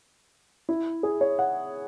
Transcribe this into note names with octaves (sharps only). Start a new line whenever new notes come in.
E4
G#4
C#5
F#5